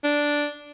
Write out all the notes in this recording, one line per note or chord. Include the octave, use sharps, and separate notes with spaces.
D4